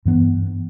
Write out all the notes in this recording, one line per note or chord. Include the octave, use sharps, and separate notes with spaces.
G2 E3 B3 D4